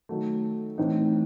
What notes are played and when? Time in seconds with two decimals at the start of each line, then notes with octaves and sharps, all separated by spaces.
0.09 D#3 F#3 A3
0.78 A2 E3 C4 D#4